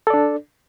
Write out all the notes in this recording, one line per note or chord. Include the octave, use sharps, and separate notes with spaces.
D4 A4 D5